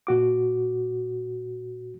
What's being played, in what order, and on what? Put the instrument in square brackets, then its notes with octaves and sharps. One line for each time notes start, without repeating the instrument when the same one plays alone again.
[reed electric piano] A#2 F#4 D6